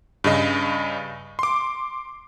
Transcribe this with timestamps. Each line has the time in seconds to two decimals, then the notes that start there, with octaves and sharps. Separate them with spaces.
0.24 G2 C#3 D#5
1.39 C6 D6